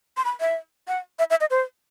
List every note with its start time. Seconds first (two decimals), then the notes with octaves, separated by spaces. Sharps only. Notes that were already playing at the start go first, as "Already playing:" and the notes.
0.17 C6
0.25 B5
0.40 E5
0.88 F#5
1.19 E5
1.30 E5
1.41 D#5
1.51 C5